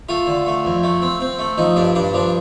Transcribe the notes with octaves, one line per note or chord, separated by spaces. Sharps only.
A3 F4
D3
A3
F2
A3
C4
C4
A3
F3 D#4
G2 D4
G2 D4
F3 D4